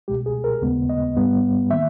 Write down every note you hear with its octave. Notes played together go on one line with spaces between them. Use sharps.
C#2 B2 G#3 G4
G#4
A#4
D#2 C#3 G#3 B3
D#5
G#2 G3 B3
D#3 A#3 E5